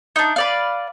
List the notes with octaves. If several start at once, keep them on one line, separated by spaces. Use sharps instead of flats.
D4 D#4
B4 D5 F5